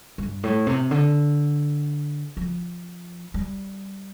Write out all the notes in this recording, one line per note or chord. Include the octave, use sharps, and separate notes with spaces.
G2
A2
C3
D3
F3
G3